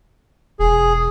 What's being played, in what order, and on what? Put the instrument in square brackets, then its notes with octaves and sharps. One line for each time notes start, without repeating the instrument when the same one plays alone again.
[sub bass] E1 [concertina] G#4